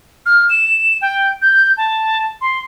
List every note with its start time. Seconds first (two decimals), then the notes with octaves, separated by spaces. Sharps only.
0.26 F6
0.50 E7
1.02 G5
1.42 G6
1.77 A5
2.41 C6